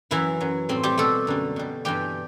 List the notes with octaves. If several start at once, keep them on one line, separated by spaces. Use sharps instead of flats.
F#2 E3 F#3 E4
F#2 F#3
A2 G3 C4
G3 G4
B2 G3 A3 A4
F#2 D3 G3
B2 G3
G2 E3 G3 G4 G5